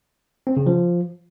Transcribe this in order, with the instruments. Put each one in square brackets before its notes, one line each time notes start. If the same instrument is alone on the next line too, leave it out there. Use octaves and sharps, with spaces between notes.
[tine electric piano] C4
C#3
F3